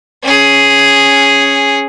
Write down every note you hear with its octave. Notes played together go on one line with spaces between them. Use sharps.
C#4 G#4